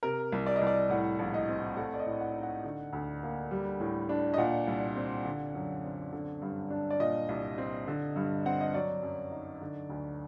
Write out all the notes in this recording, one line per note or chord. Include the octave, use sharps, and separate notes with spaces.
C3 A#4
C2
D5
D#5
C2
D5
A2 F#5
A#1
D#5
C4
A3 F#5
D5
D#5
A2
F#5
D#4
F#5
D3
D2
A#3
G3
A2
D4
D#5
A#2 F#5
C2
C4
D3
F#2
C4
D3
G2
D4
D5
A#2 D#5
C2
C4
D3
G2
C4 F#5
D#5
F#3 D5
F#2
D#4
D3
D2